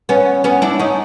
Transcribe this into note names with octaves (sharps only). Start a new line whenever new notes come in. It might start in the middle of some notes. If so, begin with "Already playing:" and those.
B3 C#4
B3 C#4
D4 E4
C#4 D#4